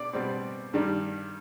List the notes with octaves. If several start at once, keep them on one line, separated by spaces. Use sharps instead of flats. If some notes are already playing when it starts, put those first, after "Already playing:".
Already playing: B2 D5
B2 G3 C4
G2 D#3 G3